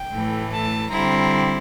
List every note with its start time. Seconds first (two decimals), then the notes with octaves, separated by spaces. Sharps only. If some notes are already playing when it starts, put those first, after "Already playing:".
Already playing: G5
0.12 A2 E3 A3
0.51 A5
0.91 D3 G3 C4 E4 A#5